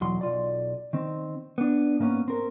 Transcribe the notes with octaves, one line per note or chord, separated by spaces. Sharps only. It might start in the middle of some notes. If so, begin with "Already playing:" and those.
B1 E2 F#3 C6
B1 F4 D5
D#3 C4
B3 D4
G#2 A#3 B3 C#4
C4 A#4